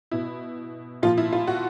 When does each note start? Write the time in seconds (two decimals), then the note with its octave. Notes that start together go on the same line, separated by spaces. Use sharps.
0.11 B2 E4
1.03 A#2 F3 F4
1.17 E4
1.33 F4
1.47 F#4